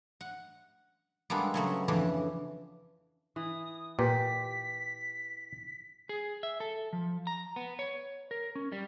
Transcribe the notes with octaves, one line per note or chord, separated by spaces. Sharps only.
F#5
G3 G#3 A#3 B3 D4 A4
C#3 F#3 A3 B3
F2 C#3 E3 D4
E3 D#6
A#2 G4 B4 B6
G#4
E5
A4
F3
A#5
B3
C#5
A#4
C#4
G3